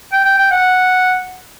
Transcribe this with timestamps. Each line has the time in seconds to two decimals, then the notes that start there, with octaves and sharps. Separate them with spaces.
0.12 G5
0.25 G5
0.38 G5
0.51 F#5